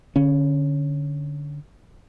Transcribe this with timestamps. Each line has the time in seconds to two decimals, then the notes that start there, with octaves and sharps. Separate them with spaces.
0.16 D3 C#4